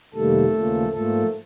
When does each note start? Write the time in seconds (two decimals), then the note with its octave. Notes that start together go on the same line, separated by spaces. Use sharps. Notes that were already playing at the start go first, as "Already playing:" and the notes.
0.14 F2 C3 D#3 G3 A3 A#3 A4
0.52 D#2 C#3 F3 A#3
0.92 G#2 F3 A3 A#3 A4